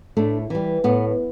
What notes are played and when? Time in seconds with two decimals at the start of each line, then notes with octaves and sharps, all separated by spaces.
0.17 A2 A3 D4
0.50 E3 G3
0.84 A2 B3